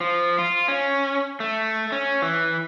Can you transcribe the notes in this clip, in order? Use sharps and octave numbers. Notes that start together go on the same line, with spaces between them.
F3
F4
C#4
A3
C#4
E3